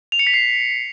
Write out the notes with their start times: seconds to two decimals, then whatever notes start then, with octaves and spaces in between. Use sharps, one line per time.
0.12 F7
0.19 C#7
0.27 B6
0.34 C7